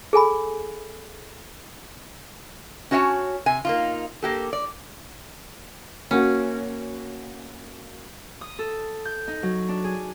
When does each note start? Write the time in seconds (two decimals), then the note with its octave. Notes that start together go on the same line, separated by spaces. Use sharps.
0.13 G#4 A4 G#5 B5
2.91 C#4 F#4 C#5 E5 G#5 A5
3.46 C3 G#5
3.65 A#3 D#4 F4
4.22 A#3 G4 A4
4.53 D5
6.11 A#3 C#4 F#4
8.41 D#6
8.59 A4
9.05 G6
9.28 D#4
9.43 F#3
9.69 D4
9.84 G#4